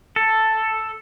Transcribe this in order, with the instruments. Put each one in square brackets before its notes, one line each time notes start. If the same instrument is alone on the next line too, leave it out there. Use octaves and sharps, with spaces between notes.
[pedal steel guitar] A4